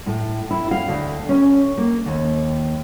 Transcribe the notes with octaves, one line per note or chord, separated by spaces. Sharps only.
A2
E4
F5
D2
C#4
A#3
D#2